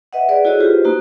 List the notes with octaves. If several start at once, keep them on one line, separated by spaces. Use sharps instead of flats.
B4 D#5 E5 F#5
G#4 B4 D5 F#5
E4 F#4 G#4 A4 C#5 D#5
F4 G4 B4 C5
A#3 D#4 F#4